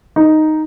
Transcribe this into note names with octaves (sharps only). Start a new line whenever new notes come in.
D#4